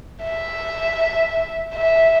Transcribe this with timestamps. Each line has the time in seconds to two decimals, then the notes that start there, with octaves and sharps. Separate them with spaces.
0.24 E5
1.75 E5